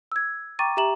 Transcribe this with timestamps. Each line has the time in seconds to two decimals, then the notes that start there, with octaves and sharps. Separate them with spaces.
0.12 E6 G#6
0.59 G5 A#5 C#6 D6 A6 D#7
0.77 G4 E5 A#5 E7 F#7